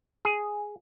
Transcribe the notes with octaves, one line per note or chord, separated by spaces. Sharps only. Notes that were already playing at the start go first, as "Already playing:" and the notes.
G#4